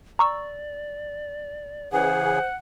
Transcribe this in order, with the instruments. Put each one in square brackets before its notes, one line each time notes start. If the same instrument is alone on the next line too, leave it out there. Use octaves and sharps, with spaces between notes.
[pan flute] D5 [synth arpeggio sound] A#5 C#6 E6
[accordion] C#3 E3 G#4 [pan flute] C5 [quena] F#5